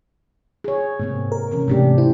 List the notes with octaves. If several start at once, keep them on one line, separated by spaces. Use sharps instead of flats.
G#4 C#5
G#2 C3 A#3 C4
A#4
C3 E3 C#4
G#2 C3 A3 D4 G4
E4 C5